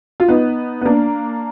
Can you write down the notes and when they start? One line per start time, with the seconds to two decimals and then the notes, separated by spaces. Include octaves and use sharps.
0.20 F4
0.28 B3 D#4
0.81 B3
0.85 A#3 D4